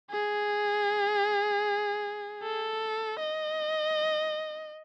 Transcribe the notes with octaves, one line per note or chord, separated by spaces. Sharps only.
G#4
A4
D#5